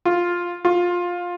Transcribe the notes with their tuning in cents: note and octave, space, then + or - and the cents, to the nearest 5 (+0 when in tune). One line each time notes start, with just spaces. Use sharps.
F4 +5
F4 +15